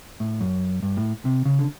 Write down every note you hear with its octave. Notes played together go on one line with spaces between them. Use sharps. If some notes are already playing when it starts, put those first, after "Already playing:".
A2
F#2
G2
A2
C3
C#3
D3